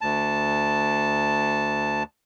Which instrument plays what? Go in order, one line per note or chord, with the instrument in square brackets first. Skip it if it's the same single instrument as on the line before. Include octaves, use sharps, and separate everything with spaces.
[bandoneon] D2 A5